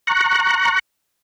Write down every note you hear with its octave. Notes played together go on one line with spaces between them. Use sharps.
A#5 C#6 F#6